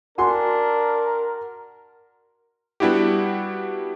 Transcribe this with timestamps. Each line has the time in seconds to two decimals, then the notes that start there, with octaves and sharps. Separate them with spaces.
0.18 D4 F#4 A#4 G#5 C6
2.80 G3 B3 D4 E4 F#4 G4